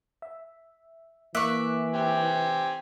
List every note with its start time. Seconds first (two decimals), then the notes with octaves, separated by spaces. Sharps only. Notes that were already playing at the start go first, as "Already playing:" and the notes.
0.22 E5
1.35 E3 A#3 E5 C#6 D6 F#6
1.94 C4 G4 G#5